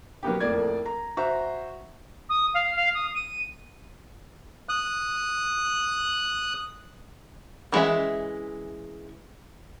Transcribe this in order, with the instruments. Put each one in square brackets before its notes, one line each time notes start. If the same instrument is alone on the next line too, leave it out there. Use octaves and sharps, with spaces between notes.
[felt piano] F#3 A#3 B3 G4
F2 A2 A#3 D5 G#6
A#5
F#4 C5 E5 A#5
[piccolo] D#6
F5
F5
D#6
D#7
[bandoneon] D#6 F#6
[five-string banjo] D#3 E3 G#3 C#4 E5